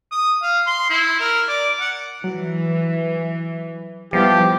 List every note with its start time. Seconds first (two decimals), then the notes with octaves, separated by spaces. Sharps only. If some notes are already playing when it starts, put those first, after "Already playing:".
0.12 D#6
0.42 F5
0.67 C6
0.90 E4
1.20 A#4
1.48 D5
1.80 F#5
2.24 E3 F#3
4.13 F3 G3 B3 E4 G4